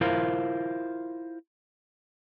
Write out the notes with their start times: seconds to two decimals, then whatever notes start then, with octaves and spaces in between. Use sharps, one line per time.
0.01 E4 F4 A#4 C5 F5